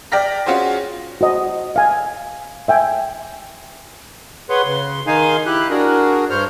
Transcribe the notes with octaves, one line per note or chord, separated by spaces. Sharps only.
D5 G5 F6 A#6 B6
C#4 F4 F#4 G#4 C5
F#4 C5 D#5
F5 G#5
E5 G5 G#5
G#4 B4 C#5 F#5 C6
C#3 C6
D#3 D#4 G#4 F5 G#5 C6
E4 G4 F#6
D4 F#4 G#4 A#4
G2 C5 C#5 F6